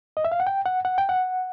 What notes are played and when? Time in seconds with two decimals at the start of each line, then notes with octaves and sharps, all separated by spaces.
0.17 D#5
0.25 E5
0.32 F5
0.40 F#5
0.47 G5
0.66 F#5
0.85 F#5
0.98 G5
1.09 F#5